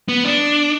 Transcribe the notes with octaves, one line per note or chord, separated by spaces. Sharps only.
B3
D4